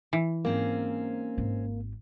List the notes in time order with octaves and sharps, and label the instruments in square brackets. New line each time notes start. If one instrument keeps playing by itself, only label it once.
[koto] E3
[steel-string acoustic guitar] G#2 C4 C#4 [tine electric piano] A#3
[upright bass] G#1